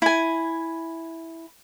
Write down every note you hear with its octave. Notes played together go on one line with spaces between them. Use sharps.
E4 G#5